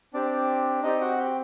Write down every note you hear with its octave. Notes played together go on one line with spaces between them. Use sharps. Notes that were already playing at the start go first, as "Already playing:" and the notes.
C4 D4 G4 D5
C4 D#4 G4 D#5
F#4 F#5
G4 G5